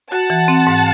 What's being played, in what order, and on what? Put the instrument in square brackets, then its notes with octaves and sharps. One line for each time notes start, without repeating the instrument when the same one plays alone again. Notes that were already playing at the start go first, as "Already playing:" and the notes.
[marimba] F#4 [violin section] F#5 A5
[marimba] E3
C4
G#2